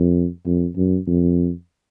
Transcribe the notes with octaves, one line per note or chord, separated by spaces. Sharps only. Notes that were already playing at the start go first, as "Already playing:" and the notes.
Already playing: F2
F2
F#2
F2